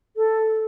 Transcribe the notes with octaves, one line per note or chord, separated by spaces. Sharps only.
A4